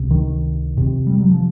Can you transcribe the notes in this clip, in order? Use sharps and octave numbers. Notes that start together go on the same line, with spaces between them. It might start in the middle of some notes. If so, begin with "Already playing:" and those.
Already playing: C#2 C3
D#3
F2 C3
G3
F#3
F3